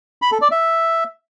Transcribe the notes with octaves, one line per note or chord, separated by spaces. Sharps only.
B5
A4
D5
E5